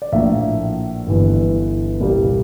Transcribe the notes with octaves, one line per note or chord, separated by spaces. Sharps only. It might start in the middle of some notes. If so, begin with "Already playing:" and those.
D5
A#1 A2 F3 A#3 E5
G1 G2 E3
C2 A#2 G3 A#3